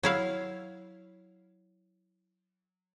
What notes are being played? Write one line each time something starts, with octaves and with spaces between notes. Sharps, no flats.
F#3 E4 F5